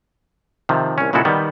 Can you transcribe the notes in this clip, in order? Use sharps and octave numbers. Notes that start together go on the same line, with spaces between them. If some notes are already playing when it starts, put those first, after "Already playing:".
C3 D#3 F3
C2 C#4
A#2 C#3 G#3 E4 F#4 A4
D#3 G3 B3